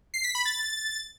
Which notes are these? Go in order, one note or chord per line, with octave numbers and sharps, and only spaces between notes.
C7
B6
B5
A6